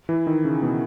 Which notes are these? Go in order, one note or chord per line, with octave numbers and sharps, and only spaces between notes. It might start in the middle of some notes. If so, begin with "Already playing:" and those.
E3 E4
D#3 D#4
C#3 C#4
B2 B3